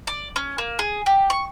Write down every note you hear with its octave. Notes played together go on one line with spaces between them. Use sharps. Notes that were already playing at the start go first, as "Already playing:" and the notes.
D5
C#4
A#3
G#4
G4
C#6